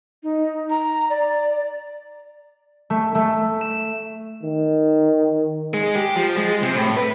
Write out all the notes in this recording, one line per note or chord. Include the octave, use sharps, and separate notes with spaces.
D#4
A#5
D5
A3
A3
E7
D#3
G#3
G4
F3
G#3
C3
A2
B4